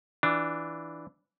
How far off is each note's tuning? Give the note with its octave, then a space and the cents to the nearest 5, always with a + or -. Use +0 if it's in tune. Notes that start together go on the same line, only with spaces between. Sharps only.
E3 +0 D4 +0 F4 +0